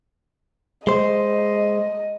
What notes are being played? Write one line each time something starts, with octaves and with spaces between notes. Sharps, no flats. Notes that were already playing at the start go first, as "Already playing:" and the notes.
G#3 C5 D#5